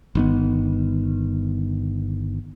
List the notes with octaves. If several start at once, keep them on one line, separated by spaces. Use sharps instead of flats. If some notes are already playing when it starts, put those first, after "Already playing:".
G1 D#3 B3